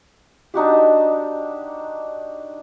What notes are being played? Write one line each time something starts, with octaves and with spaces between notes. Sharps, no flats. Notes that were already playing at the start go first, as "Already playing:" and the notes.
D4 D#4 F#4 G4